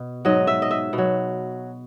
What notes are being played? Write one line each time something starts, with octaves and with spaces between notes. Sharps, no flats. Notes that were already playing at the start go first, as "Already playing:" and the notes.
Already playing: B2
G#2 F#3 D#5
E5
D#5
E5
B2
F#3